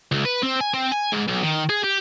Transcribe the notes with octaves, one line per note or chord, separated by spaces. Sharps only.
C#2
B4
C4
G#5
C4
G#5
G#2
B1
D#3
G#4
G4